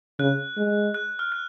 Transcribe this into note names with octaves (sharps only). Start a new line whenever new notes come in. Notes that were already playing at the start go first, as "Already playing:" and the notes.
C#3 F#6
G#3
F#6
F6
F#6